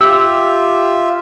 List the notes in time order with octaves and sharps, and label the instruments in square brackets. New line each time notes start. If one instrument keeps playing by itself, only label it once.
[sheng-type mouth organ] F4 E5 [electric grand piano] G4 [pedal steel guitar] E6